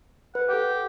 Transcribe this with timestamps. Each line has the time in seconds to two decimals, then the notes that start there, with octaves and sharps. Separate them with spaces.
0.35 B4 F#5
0.49 G4 A4 F#5